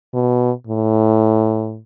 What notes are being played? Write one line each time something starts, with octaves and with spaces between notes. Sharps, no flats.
B2
A2